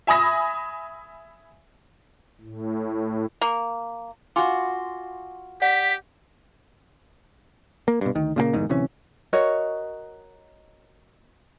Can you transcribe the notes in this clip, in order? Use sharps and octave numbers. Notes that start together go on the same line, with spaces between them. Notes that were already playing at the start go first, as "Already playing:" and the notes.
E5 G#5 B5 D#6 A#6
A2
A#3
F4 F#4 G#5 C6 D6
G4 D5 F#5 B6
A#3
G2 B2
D2 D#3
A#2 C#3 F3 A#3
F1 E2 G#2 D#3
D1 C3 E3 C#4
F#4 A#4 C#5 D#5